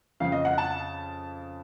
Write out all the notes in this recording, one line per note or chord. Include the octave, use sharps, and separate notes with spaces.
F2 C#3 F5
D#5
F#5
A5